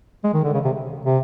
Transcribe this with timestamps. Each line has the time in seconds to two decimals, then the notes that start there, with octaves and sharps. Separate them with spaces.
0.24 G#3
0.34 D#3
0.44 D3
0.54 C#3
0.65 C3
1.06 C3